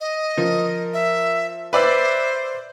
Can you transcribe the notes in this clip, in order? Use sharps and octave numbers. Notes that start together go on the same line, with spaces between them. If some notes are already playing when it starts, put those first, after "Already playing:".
D#5
F3 A#4
E5
B4 C5 D5 E5 E6